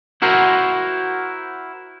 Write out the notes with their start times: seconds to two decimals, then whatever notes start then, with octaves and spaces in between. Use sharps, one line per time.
0.22 E4 F#4 A#4 C5